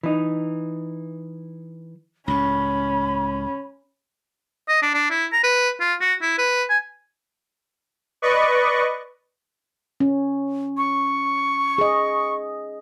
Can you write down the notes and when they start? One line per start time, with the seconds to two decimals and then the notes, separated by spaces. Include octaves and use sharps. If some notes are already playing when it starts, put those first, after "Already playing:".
0.03 E3 D#4
2.28 C#2 A2 C#4 B5
4.68 D#5
4.83 D4
4.94 D4
5.10 E4
5.32 A#5
5.44 B4
5.80 F4
6.01 F#4
6.22 E4
6.38 B4
6.70 G#5
8.22 B4 D5 D#5 C#6
10.00 C#4
10.77 C#6
11.78 G#4 D#5